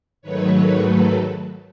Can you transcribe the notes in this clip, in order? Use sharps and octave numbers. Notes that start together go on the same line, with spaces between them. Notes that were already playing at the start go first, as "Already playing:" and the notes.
G#2 D#3 F#3 A3 B4 C#5
B4 C#5
A4 B4